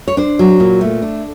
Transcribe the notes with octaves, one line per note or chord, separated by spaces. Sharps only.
C#5
D4 C5
F#3
A#2
A3
D4